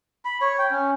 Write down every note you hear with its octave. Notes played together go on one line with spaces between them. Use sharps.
B5
C#5
G5
C#4